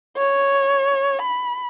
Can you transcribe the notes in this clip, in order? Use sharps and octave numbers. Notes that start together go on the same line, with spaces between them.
C#5
B5